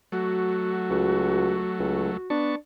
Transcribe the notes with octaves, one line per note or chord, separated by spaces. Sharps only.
F#3 A3 F#4
C#2
C#2
B3 D4 A5 C#6